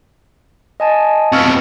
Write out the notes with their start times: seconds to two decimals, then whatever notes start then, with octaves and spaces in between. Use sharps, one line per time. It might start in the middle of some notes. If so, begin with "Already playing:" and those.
0.80 D#5 G#5 A5
1.33 F2 B2 C#6 E6 F6